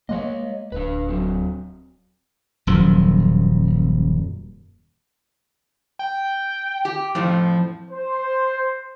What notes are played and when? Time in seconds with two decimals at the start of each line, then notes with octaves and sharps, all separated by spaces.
0.09 G#3 A#3 C#5 D#5
0.72 D1 D4 B4
1.09 F#3 C4 F#4
2.67 D#1 F#2 A#2 F3
5.99 G5
6.85 G4
7.15 F2 A2 F3
7.90 C5